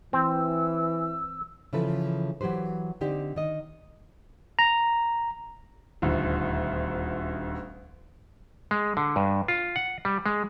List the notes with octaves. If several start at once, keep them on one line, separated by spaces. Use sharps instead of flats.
E3 C4 E6
C#3 E3 F3 E4 A4 B4
E3 F#3 G4 B4 C5
D3 C4 D#4 G4
D#3 D#5
A#5
D#1 D2
G#3
D3
G2
F4
F#5
G3
G#3